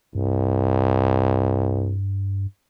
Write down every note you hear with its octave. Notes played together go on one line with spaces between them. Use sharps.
C2 G2